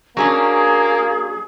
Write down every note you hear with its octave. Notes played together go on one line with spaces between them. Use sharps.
F#3 A#3 C#4 D4 G#4